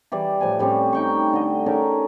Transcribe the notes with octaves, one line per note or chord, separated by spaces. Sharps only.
E3 G3 D5
A2 F3 G#5
A2 G3 C4 C#4
D#4 G5 C#6
D3 D#5
C#4 D#4 A4 A#4